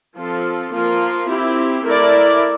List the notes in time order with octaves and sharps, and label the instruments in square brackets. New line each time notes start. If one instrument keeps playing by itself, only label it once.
[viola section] F3 C4 F4 A4
F3 A#3 F4 A#4
C4 E4 G4
A3 E4 A#4 D5